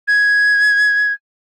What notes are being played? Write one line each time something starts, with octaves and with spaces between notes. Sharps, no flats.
G#6